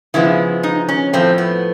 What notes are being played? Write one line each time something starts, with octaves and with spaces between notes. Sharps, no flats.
C#3 F3 G#3 B3 E4
D#4
C#4
A2 F3 A3 C4
B3